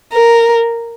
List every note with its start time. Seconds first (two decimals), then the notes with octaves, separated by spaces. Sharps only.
0.13 A#4